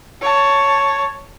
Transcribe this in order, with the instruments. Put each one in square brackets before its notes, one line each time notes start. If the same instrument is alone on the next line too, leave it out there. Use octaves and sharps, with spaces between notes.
[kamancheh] C#5 A5